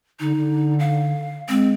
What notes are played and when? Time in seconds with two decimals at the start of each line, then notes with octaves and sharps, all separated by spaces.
0.20 D3 D#4
0.36 D3
0.79 F5
1.49 G#3 C4